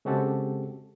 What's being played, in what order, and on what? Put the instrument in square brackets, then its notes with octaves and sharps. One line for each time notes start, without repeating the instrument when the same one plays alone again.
[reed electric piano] C#3 G#3 C4 F#4 G4 A4